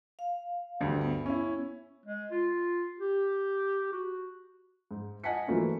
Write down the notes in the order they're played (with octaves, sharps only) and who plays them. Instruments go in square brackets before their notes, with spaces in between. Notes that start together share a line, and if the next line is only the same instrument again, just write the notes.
[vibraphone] F5
[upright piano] D2 G2
[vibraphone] B3
[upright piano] C#4 E4
[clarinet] G#3
F4
G4
F#4
[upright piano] G#2
D#5 F#5 G#5 A5 B6 C#7
E3 F#3 A3 A#3 C#4 F4